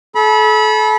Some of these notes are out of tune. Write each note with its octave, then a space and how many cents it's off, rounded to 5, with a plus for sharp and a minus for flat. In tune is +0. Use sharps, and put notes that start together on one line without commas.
A4 -35 B5 -25